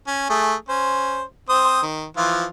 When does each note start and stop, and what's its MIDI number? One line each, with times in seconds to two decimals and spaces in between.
0.07 0.26 61
0.30 0.54 57
0.30 0.54 68
0.69 1.22 61
0.69 1.22 72
1.49 1.81 60
1.49 1.81 72
1.49 1.81 87
1.82 2.05 51
2.17 2.45 52
2.17 2.45 53
2.17 2.45 65